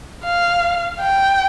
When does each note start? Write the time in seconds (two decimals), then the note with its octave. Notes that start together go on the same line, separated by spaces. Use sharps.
0.24 F5
1.00 G5